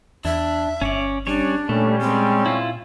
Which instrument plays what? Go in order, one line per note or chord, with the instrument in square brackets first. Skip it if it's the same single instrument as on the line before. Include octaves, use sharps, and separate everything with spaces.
[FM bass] E2 [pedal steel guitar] D4 [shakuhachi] E5
[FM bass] G1 [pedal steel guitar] C#4 C#5 D5
[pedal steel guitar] G3 C#4 C#5 [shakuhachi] D4
[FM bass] A#2 [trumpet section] G3 C#4 [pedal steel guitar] A3
[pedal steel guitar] G#3 [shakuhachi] C4
[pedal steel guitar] E4 F4